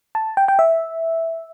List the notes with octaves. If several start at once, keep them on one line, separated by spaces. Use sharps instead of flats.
A5
G5
G5
E5